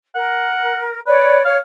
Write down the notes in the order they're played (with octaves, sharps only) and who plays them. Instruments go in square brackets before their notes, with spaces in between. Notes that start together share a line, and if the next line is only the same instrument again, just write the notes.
[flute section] A#4 [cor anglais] F#5
[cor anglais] B4 [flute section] C#5 D5
[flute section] C#5 [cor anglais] F5